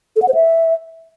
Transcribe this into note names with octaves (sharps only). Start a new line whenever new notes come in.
A4
F#5
C5
E5